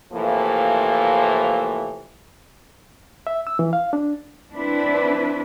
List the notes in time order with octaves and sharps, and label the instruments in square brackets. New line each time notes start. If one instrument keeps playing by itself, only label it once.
[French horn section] A2 C3 E3 F3 A#3
[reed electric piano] E5
E6
E3
F5
D4
[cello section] C4 D4 E4 B4